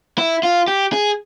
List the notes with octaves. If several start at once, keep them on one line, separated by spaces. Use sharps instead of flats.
E4
F4
G4
G#4